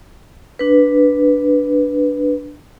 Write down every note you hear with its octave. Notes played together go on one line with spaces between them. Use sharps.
D4 B4